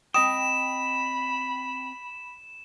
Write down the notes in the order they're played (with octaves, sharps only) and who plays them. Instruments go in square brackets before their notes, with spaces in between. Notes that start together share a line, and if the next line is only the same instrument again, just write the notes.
[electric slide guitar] C4 D#5 G5 [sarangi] B5 [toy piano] D#6 [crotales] E7